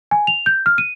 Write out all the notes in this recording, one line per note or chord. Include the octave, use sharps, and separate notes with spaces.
G#5
F7
G6
F6
D#7